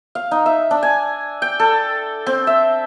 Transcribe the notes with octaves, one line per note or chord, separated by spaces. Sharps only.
F5
D#4
E5
D4
G#5
G5
A4
C4
E5